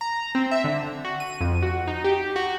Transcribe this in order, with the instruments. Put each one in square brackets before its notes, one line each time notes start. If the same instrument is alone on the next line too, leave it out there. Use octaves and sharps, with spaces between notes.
[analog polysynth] A#5
C4
E5
D3
F#4
D#7
F2
F#4
D#4
G4
F#4